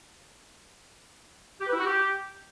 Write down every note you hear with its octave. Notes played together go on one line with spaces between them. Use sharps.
G4
B4
E4
F#4
G4